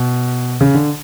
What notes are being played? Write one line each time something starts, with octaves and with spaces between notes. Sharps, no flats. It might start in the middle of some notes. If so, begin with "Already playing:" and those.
Already playing: B2
C#3
D3